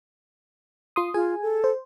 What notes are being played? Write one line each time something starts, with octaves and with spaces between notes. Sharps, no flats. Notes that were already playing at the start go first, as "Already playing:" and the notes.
F4 C6 D#6
F4 G#4 G#5
A4
C5